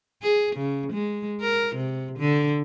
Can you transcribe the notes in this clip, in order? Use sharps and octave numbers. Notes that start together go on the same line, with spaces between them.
G#4
C#3
G#3
A#4
C3
D3